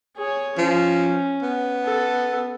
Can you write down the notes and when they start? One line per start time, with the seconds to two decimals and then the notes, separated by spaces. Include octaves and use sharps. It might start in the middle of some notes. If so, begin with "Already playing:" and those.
0.17 G#4 C#5
0.58 F3 C#4
1.43 B3
1.85 A4